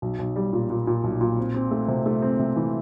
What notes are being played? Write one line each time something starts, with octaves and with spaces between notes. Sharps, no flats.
B1
B1
G3
A#2
A#2
A#2
B1
A#2
C4
C4
A3
C3
A3
C4
C3
E3